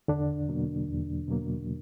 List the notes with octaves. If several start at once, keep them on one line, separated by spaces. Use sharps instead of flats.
E2 D3 D4
B2 F#3 A#3
E2
B2 F#3 A#3